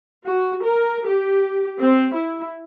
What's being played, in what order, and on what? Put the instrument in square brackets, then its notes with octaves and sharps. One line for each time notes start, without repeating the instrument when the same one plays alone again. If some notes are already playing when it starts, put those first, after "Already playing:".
[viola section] F#4
A#4
G4
C4
E4